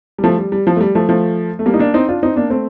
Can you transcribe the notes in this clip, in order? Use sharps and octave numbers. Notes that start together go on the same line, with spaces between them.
G3
F3 A3
G3
G3
F3
A3
G3
F3 A3
F3 A3
A3
G3 A#3
D#4
A#3 D4
C4 D#4
D4 F4
C4 D#4
A#3 D4
A3 C4